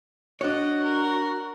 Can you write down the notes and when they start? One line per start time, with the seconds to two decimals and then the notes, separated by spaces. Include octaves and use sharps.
0.41 D4 F#4 C#5 D#5
0.84 A#4